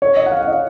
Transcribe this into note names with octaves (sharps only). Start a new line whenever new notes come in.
C#5
D#5
F#5
F5
F5
D#5